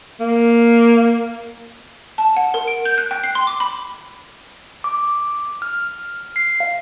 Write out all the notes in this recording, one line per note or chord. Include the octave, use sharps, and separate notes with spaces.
A#3
A5
F#5
A#4
D7
G6
F#6
G5
C7
C6
D6
B5
D6
F6
C7
F5